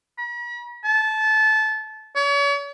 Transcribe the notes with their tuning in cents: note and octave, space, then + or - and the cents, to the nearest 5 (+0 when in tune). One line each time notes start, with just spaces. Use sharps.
B5 -45
A5 -20
C#5 +40